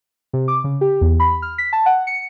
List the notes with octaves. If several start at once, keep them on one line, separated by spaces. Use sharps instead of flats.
C3
D6
C#3
G4
E2
B5
F6
B6
A5
F#5
C#7